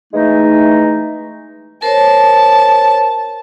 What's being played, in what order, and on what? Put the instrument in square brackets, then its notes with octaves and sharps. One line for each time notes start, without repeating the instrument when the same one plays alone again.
[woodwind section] E3 G#3 A3 D#4
[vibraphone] A#4 C5 C#5 [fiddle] A5